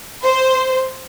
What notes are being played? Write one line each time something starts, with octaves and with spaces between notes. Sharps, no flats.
C5